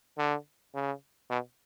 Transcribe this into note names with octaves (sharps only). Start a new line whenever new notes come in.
D3
C#3
B2